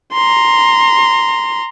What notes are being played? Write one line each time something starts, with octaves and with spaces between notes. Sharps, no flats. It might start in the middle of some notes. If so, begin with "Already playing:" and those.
A#5 C6